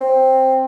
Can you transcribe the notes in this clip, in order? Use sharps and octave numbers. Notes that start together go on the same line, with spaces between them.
C4